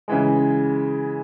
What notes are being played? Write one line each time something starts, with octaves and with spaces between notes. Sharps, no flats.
C#3 E3 G#3